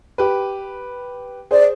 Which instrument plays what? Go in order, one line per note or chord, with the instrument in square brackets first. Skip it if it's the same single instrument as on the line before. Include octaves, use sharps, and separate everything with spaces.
[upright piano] G4 B4
[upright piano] G#4 C5 [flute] D5